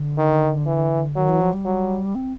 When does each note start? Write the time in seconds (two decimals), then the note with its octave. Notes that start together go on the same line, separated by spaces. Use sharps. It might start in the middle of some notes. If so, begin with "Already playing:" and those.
Already playing: D3
0.18 D#3
0.66 E3
1.16 D#3 F#3
1.29 E3
1.41 F3
1.53 G3
1.65 F#3
2.15 C4